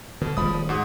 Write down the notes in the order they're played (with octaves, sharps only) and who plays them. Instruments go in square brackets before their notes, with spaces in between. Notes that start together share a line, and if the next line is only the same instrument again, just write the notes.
[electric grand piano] B2 [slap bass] D3
[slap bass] D#1 G#3 [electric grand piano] F3 B5 D#6
[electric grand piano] G#2 F#4 D#6